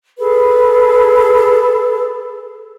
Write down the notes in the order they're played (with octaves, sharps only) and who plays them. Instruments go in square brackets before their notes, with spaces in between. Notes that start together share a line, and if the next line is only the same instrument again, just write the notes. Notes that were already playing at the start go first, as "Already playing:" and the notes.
[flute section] G#4 A4 B4